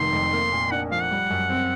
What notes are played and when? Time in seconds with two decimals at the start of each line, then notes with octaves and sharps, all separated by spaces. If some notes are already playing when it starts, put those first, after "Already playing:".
Already playing: F1 C3 D#3 C6
0.13 F2
0.32 A#3
0.52 A#2
0.71 D4 F#5
0.91 F3 F5
1.02 F#5
1.11 G3
1.30 F#2
1.50 C4